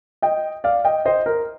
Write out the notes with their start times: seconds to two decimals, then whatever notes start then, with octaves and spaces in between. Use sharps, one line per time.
0.22 D#5 G5
0.64 D5 F5
0.85 D#5 G5
1.05 C5 D#5
1.26 A#4